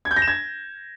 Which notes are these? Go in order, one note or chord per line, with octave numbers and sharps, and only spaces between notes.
G#6
G6
A#6
E7
G#6